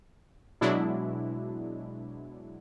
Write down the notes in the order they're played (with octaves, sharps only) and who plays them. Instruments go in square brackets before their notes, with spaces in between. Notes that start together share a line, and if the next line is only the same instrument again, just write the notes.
[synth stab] B2 F#3 G#3 D4 E4